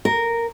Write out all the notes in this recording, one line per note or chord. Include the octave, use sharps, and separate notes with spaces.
A#4